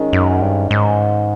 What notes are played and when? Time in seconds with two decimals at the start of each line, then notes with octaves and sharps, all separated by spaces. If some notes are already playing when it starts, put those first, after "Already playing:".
Already playing: D#3 G#3 C#4
0.13 F#2
0.42 G2
0.71 G#2